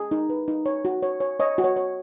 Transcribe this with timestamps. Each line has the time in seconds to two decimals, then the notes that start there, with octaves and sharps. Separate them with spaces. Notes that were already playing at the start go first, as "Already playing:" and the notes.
Already playing: G#4
0.11 D#4
0.30 B4
0.48 D#4
0.66 C#5
0.85 F#4
1.03 C#5
1.20 C#5
1.40 C#5 D#5
1.58 F#4
1.64 C#5
1.77 C#5